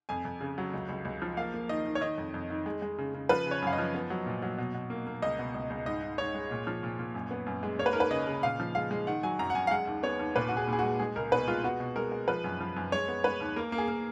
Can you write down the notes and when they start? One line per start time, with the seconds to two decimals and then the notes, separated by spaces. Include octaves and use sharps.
0.09 F2 G#5
0.25 F2
0.41 C#3
0.58 F#3
0.74 C#2
0.89 C#2
1.05 C#2
1.22 F3
1.37 A#3 F5
1.54 A#3
1.69 D#3 D#5
1.86 D#3
1.95 C#5
2.01 D#3 D#5
2.18 F2
2.34 F2
2.50 D#3
2.66 G#3
2.82 G#3
2.98 C#3
3.14 C#3
3.29 F3 B4
3.46 C#3
3.51 C#5
3.62 F#2 F5
3.73 D#5
3.78 F3
3.95 B3
4.10 F#3
4.26 A#2
4.42 F#3
4.58 B2
4.74 B2
4.90 A#3
5.07 A#3
5.22 C#2 D#5
5.39 B2
5.54 C#2
5.70 C#2
5.86 G#2 D#5
6.03 G#2
6.18 G#2 C#5
6.34 G#3
6.51 A#2
6.67 F3
6.83 A#2
6.99 A#2
7.15 F#2
7.31 B3
7.46 F#2
7.63 G#3
7.79 A#3 C#5
7.86 B4
7.93 D#2 A#4
8.00 B4
8.11 C#3 D#5
8.27 C#3
8.43 A#2 F5
8.60 F3
8.75 G#3 F5
8.91 G#3
9.07 D#3 F#5
9.23 F#3 G#5
9.39 F#2 A#5
9.50 F#5
9.55 F#2 G#5
9.67 F5
9.71 G#3 F#5
9.87 D#2
10.03 B3 C#5
10.19 D#2
10.36 A#2 B4
10.48 F#4
10.52 A#2 G#4
10.67 A#2
10.73 G#4
10.79 G#3 F#4
10.99 G#3 G#4
11.16 C#2 A#4
11.32 B2 B4
11.48 G#3 F4
11.64 B3 F#4
11.80 B2
11.96 G#3 A#4
12.12 G#3
12.28 F3 B4
12.44 F#2
12.61 F3
12.76 F#2
12.92 G#3 C#5
13.08 B3
13.24 G#3 B4
13.40 D#2
13.56 A#3 A#4
13.72 A#3
13.78 G#4
13.88 A#3